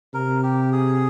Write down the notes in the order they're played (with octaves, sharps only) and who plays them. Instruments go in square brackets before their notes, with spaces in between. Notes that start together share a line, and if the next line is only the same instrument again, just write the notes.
[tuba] C3 [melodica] A#4
[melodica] G4
G#4